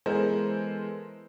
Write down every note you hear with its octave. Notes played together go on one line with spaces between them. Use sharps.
E3 G#3 B3 A4 A#4 C5